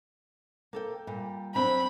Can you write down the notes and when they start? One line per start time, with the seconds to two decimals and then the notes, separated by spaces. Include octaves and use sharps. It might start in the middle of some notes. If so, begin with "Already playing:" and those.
0.73 A#3 A4 G5
1.07 A#2 G3
1.55 F#3 C4 D4 B5